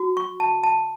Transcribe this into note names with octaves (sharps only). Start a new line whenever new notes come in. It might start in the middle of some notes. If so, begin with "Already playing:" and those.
Already playing: F#4
C#6
A5
A5